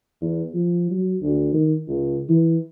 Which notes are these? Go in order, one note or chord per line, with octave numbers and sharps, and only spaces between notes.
E2
F3
F#3
D2
D#3
C#2
E3